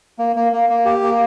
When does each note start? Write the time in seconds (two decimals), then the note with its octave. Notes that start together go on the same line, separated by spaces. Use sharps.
0.19 A#3
0.36 A#3
0.53 A#3
0.70 A#3
0.85 G4
1.02 A#3